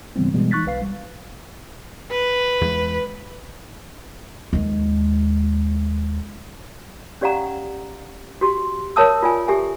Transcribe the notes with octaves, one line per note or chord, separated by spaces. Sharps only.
G#2 C#3 E3 G3 B3 C4
G2 B2 E3 G3 G#3 B3
E3 D#4 C#6 F#6 A6 B6
B1 B4 F5 C7
G3
B4
E2 G#3
D#2 G#3
C#4 G4 D5 F5 F#5 A#5
F#4 G4 C6
A#4 C#5 E5 A5 D#6 E6
F4 D5 G#5
G4 A4 E5 G#5